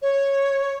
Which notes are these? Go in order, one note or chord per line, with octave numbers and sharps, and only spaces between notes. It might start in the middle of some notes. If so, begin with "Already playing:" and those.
C#5